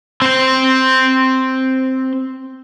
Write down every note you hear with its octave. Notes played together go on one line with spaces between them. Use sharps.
C4 C5